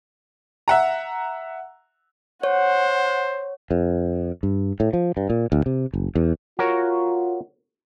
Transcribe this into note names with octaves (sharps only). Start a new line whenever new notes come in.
E5 F#5 A#5
C5 C#5 F#5
F2
G2
A2
F3
G2
A#2
D2
C3
F#1
E2
F4 F#4 A#4 C#5